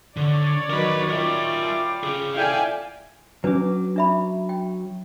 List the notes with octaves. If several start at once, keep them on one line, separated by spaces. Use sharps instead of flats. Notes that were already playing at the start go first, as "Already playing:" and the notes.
D3 C#5 D5
D#3 F#3 A#4 B4 B5
G3 F4 A#4 E5 D6
G#4 C#5
E4 A4 D5 F5 G5 G#5
F#3 C#4 D4 B4 D6
D4 E5 B5
G5